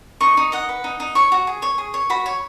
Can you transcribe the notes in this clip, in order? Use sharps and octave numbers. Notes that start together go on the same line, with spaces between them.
D#4 C#6
D#4
D#5 F#5
B4
D#4
D#4
C#5 C#6
F#4
G#4
C#5
G#4
C#5
F#4 B5
C#5